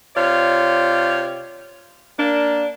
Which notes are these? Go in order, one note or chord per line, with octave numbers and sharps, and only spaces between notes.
C3 F4 C#5 D5
A#3 D4